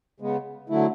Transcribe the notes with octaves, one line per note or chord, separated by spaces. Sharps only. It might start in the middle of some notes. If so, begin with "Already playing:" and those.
C#3 G#3 B3
D3 F#3 A3 E4